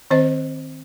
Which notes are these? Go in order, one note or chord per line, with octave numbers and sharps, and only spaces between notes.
D#3 C4 C5 D#5